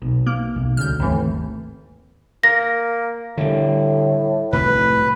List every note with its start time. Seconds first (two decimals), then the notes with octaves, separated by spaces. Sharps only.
0.02 B1
0.27 A#3
0.56 B1
0.77 D2 C#3 F6 G6
1.00 G#1 D#2 D#3 E3 A3
2.43 A#3 A#6
3.37 A2 D3 G3
4.53 C2 A2 B4